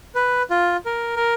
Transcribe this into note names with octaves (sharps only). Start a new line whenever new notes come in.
B4
F4
A#4
A#4